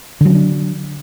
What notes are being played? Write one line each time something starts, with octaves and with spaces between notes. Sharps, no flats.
D3 F#3 C#4 D4